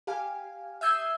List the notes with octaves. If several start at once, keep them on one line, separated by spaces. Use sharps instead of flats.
G4 F5 G#5
E5 D#6 E6 G6 G#6 C7